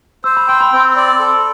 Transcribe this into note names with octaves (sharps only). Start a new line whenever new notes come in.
C5 E6
B5
G5 C6
B5
C4
D5
A4